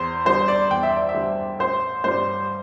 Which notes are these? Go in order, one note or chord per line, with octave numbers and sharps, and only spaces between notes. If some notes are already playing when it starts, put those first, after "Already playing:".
Already playing: E2 C5
D3 G3 C5
D5
E2 G5
E5
D5
E5
D3 G3
A1 C5
G2 G3 C5